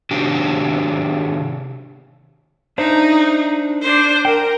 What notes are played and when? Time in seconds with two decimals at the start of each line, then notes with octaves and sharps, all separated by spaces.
0.11 C3 D#3 D4 F#4 G4
2.78 D4 D#4 C5 E5
3.82 D4 C5
4.25 A#4 G5